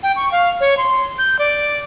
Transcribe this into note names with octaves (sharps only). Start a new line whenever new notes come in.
G5
C#6
F5
C#5
C6
G6
D5